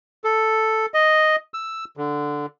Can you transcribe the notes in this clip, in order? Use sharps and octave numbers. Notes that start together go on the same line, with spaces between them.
A4
D#5
E6
D3